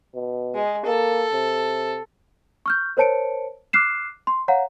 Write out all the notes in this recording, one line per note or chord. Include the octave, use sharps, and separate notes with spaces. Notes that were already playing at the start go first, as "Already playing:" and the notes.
B2
G#3
A#3 A4
C3
C#6 F6 G6
A#4 C5 C#5 A5 C#7 D7
D6 F6 F#6 C7 E7
C6
C#5 F5 F#5 A#5